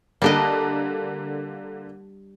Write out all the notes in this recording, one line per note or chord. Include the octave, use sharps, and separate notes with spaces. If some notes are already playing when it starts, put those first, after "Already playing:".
D3 G3 A#3 D4 D#5